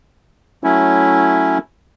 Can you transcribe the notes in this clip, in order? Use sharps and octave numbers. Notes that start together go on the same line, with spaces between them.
F#3 A3 C#4 E4